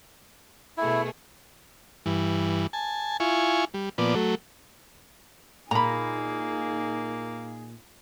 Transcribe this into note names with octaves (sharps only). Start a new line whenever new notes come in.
B2 A3 E4 G#4
G2 E3
G#5 A5
E4 F4 G#5 C#6
G3
A#2 F3 B3 D5
F#3 A3
A#2 A#3 D#4 G#4 A#5 B5